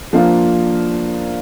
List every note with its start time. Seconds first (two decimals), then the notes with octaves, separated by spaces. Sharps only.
0.13 F3 A#3 D4 F4 A#4